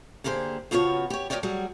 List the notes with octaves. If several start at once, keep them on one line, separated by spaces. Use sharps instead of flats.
D3 A#3 G4 G#4 C5
C#3 F3 B3 F4 F#4 C#5
G4 C#5
D2 A#2 A#4 C#5 D5 G5
F#3 G3 F#4 G#4